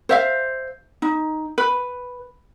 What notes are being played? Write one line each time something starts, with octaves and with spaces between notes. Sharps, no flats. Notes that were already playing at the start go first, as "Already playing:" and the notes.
C5 E5 F5
D#4
B4